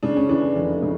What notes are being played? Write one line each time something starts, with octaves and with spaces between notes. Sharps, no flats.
C#3 D4
C#4
E3 D4
F1
C#3